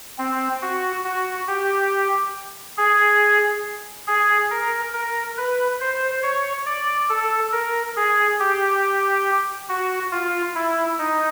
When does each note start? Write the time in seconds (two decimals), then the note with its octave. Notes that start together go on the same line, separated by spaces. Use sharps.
0.18 C4
0.62 F#4
1.05 F#4
1.48 G4
2.78 G#4
4.07 G#4
4.51 A#4
4.93 A#4
5.37 B4
5.81 C5
6.23 C#5
6.66 D5
7.09 A4
7.52 A#4
7.97 G#4
8.40 G4
9.69 F#4
10.12 F4
10.55 E4
10.99 D#4